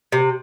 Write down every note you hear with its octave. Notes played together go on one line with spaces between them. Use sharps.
C3